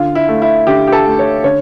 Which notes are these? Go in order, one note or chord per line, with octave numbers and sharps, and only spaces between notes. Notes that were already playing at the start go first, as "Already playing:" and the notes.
Already playing: D3 F4
E4
A3
E4
D3 G4
G4
A4
A3
C#5
D3 C#5